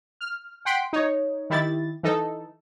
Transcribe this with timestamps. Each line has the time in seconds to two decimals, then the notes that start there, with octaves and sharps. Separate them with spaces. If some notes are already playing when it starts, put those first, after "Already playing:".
0.21 F6
0.65 F#5 G5 C6 B6 D7
0.93 D#4 C#5
1.50 D#3 E4 G4 A6
2.03 E3 D#4 A4